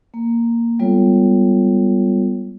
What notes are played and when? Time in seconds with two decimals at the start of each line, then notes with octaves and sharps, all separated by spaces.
0.14 A#3
0.79 G3 G#3 B3 F4 A4 C#5